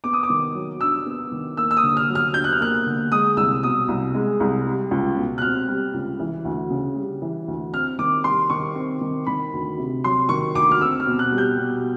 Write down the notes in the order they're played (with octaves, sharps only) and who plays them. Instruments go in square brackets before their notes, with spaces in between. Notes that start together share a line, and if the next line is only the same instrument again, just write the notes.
[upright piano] B3 [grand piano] D6
[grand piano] D#6
D6
[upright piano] D#3
F#3
[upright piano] D4 [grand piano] E6
[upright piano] B3
D#3
[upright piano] A#3 [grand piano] E6
[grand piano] E6
D#6
[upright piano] D3
[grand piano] F6
[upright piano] F#3
[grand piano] F6
[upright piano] D4 [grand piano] G6
[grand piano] F#6
F6
[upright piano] A#3 [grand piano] F#6
[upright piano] D3
[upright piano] G#3 [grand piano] D#6
[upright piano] C2 [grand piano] E6
[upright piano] B2 [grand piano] D#6
[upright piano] C2
G#3
C2
G3
C#2
B2
[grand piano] F#6
[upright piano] C4 [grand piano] F6
[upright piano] G3
C#2
E3
D2
C#3
G3
E3
D2
[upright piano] C4 [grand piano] F6
[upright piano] D#3 [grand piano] D6
[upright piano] G3 [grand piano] C6
[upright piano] D#3 [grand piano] C#6
[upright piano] C4
D#3
[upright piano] D#3 [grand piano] B5
[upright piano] D2
C3
[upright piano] F#3 [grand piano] C6
[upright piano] D#3 [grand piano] C#6
[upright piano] D2 [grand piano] D6
[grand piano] F6
[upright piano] C4 [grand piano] E6
[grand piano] F6
[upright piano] B2
[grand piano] F#6
[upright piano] G3
[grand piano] G6
[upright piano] B2